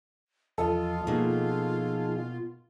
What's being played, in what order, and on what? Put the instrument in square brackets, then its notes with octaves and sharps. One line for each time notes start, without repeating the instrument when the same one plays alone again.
[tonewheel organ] E2 F3 D#5 [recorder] F4 [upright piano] A4
[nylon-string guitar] B2 A#3 [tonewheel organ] F3 D#4 G#4